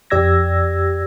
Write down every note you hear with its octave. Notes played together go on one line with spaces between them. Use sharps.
F2 G4 D5 E6 G#6 A#6